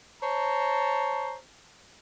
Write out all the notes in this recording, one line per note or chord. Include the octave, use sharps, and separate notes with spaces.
C5 C#5 A5 A#5